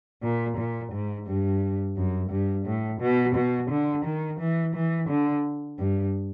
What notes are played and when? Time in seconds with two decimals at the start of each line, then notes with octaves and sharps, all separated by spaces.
0.22 A#2
0.57 A#2
0.92 G#2
1.26 G2
1.96 F#2
2.31 G2
2.65 A2
3.01 B2
3.35 B2
3.70 D3
4.05 D#3
4.40 E3
4.75 E3
5.09 D3
5.79 G2